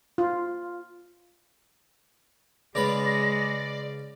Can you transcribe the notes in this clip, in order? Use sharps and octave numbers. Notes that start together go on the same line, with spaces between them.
F4
C#3 G#3 B4 D5 B5 A#6